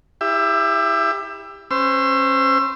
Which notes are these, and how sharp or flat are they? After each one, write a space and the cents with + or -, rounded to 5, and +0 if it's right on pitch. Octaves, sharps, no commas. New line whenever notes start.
E4 -10 G4 +25 E5 +25
C#4 -30 C5 -20 E6 +30